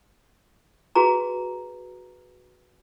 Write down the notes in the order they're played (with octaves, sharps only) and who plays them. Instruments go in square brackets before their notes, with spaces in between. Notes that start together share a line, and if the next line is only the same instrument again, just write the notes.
[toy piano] F#4 G#4 B4 A#5